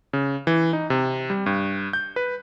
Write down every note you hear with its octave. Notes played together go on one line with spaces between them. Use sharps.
C#3
E3
D#4
C3
G3
G2
G6
B4